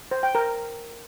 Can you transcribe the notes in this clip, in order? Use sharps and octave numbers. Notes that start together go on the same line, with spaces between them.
C5
G5
A#4